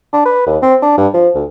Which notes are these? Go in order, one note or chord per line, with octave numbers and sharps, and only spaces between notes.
D4
B4
D#2
C4
D4
G2
F3
D2